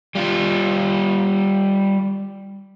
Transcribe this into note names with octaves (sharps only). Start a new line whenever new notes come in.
G3 F4